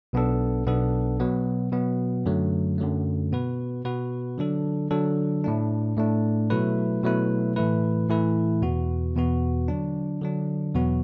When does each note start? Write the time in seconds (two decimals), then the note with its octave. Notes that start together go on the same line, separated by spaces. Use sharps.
0.13 B1 B2 B3 D4 A4
0.66 B1 B2 B3 D4 A4
1.20 B2 F#3 B3
1.72 B2 F#3 B3
2.26 F#2 D3 F#3 A3
2.78 F#2 D3 F#3 A3
3.32 B2 B3 F#4 B4
3.85 B2 B3 F#4 B4
4.38 D3 F#3 D4 A4
4.91 D3 F#3 D4 A4
5.44 A2 A3 D4
5.97 A2 A3 D4
6.50 B2 F#3 A3 E4 B4
7.03 B2 F#3 A3 E4 B4
7.56 A2 E3 A3 E4 B4
8.09 A2 E3 A3 E4 B4
8.62 E2 B2 B3 F#4
9.15 E2 B2 B3 F#4
9.68 D3 F#3 D4
10.21 D3 F#3 D4
10.75 E2 B2 F#3 B3 F#4